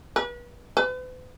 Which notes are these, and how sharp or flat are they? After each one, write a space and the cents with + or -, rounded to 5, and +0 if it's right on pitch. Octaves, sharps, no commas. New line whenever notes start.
B4 -35
B4 +45